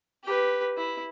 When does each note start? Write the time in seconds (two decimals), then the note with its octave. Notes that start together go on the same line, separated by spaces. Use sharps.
0.24 G4 B4
0.77 E4